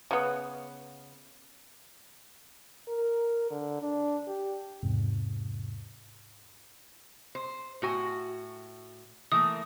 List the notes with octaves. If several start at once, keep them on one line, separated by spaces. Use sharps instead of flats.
C#3 B3
A#4
D3
D4
G4
E2 G#2 C3
C5
A2 F#4 G#5
E3 A3 A#3 D#6